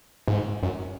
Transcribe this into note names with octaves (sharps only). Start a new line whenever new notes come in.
G#2
F#2